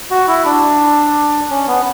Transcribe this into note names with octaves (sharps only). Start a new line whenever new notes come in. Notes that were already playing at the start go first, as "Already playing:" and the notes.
F#4
E4
D4
C#4
B3